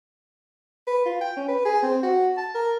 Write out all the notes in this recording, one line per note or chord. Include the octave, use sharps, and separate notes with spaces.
B4
F4
G5
C#4
B4
G#4
C4
F#4
A5
A#4